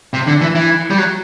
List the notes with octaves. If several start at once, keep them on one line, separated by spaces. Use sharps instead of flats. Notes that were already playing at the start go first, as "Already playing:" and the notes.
C3
D3
E3
E3
G3
F#3